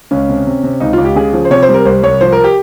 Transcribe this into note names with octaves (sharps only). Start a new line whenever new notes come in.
C#2 C#4
C3
C3
C3
C#2 D#4
C#2 F4
G4
C#3 G#4
F3
C5
C3 C#5
C5
G3
A#4
C2 C5
C2 C#5
F3 C5
A#4
G4